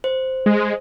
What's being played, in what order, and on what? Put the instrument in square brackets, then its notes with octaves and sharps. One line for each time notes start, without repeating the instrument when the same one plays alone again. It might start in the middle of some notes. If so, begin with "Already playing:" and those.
[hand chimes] C5
[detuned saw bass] G#3